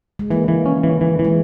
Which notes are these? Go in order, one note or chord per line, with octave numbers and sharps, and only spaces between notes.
G#3
E3 A#3
E3
C#4
E3
E3
E3
G#3